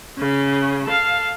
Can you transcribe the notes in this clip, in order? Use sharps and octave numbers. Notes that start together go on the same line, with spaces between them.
C#3 C#4
A4 F5